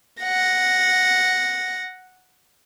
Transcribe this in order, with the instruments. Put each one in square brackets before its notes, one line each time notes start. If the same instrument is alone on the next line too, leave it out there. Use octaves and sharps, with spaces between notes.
[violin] F#5 A#6